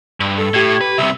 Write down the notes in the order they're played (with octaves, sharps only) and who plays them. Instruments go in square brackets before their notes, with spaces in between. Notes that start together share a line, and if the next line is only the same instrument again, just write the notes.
[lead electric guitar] G2
[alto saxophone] A4
[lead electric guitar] A2 [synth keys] G4 G#6
[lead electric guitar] B4
[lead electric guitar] C2 C3 [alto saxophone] E5